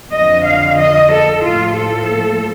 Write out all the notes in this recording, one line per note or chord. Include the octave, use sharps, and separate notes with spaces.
F2 D3 F3 D#5
F5
D#5
A4
A2 F3 A#3 F4
A4